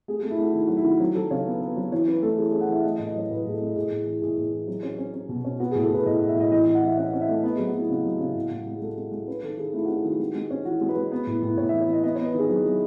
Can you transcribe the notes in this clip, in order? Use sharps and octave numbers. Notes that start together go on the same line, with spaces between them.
A3 G#4
A3 G#4
E4
A3 F#4
D#3 E4
F#3 F#4
E4
D#3 F#4
F#3
F#3 A4
C#3 C#5
B3
B3
F#3
E3 C#5
C#4 B4
A3 A4
E3 G#4
C#4 G#4
F#5
E3 E5
A3 D#5
D#5
A2
D#5
F#3 C#5
A2 B4
A2 G#4
A4
A3
A2 G#4
A2
E3
A2 G#4
A2
E3
F#3
C#4
C#4
C#4
B2
C#4
B3 F#4
A2 G#4
A4
A2 B4
A2 D#5
A2
E5
A2 D#5
E3 D#5
E3 D#5
F#5
E3 E5
C#4 F#5
C#4
E5
A3
B3 D#5
F#3 G#4
F#4
B3 E4
C#3 F#4
F#3
C#3
A2
A2
G#3
G#4
G#3 A4
G#3
G#3
C#4 B4
D#3 A4
D#3 G#4
A3 E4
C#4 F#4
G#4
D#3 F#4
G#3
G#3
C#4
E3 F#4
G#3
B4
G#3
B3
A2
A2
A2 C#5
E3 E5
C#5
E3 D#5
B3 D#5
B3 C#5
B4
D#3 G#4
F#3 G#4
F#3